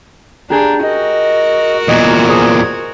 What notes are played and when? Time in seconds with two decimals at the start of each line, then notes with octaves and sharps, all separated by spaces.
0.50 D4 G4 G#4 A#5 G6
0.83 F#4 A#4 D#5
1.88 E2 A#2 D#5 G#6
2.29 G#4 C5 D#6